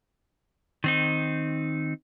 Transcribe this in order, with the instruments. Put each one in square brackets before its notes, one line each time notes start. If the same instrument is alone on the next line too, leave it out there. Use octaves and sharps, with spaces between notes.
[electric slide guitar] D#3 C4 D#4